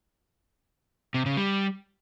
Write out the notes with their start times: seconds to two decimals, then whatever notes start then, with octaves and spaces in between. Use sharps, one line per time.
1.14 C3
1.26 C#3
1.37 G3